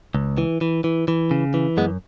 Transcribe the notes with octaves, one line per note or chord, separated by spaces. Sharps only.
C#2
E3
E3
E3
E3
C#3
E3
F#2 G#3 B3